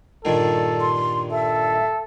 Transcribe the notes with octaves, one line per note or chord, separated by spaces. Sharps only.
G2 A#2 D#3 A4
C6
A4 E5